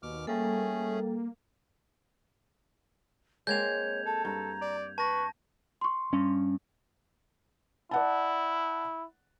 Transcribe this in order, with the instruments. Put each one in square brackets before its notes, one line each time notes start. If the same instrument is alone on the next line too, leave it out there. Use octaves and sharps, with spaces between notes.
[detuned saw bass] D#2 [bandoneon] B2 D6 F6
[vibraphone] G3 A4 [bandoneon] A3 C#4 G#4 [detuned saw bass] A#3
[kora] G#3 A#3 C4 [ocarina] C#5 [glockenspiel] G6 G#6 F7
[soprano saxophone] A4 [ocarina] A5
[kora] G2 [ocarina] A#5
[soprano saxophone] D5
[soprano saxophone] B4 [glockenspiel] A5 A#6 [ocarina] C#6
[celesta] C6 C#6
[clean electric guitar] G2 [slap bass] C#4
[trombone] E4 [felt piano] D5 F#5 A5